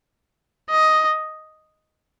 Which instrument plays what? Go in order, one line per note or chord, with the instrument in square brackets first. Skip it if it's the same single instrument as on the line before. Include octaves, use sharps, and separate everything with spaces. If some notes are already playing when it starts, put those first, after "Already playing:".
[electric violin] D#5